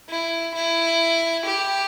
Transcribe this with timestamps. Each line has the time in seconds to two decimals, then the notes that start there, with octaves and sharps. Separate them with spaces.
0.10 E4
0.55 E4
1.46 G4